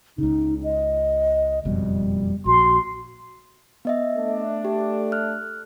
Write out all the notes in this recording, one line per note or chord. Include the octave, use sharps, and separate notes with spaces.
C#2 C#3 D#4
D#5
F#1 F2 B2 G3
A#1 F#4 C6
B3 D#5 E5
A3 D4
G4
F6 F#6